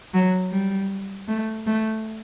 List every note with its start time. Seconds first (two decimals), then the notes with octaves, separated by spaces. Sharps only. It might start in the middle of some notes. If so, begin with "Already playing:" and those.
0.14 F#3
0.51 G3
1.28 A3
1.67 A3